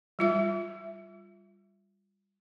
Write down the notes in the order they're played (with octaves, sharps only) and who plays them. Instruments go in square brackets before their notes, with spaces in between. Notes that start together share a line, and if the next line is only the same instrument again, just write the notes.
[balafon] G3 F4 E5